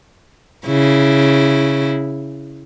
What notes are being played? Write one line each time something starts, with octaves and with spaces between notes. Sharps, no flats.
C#3 E4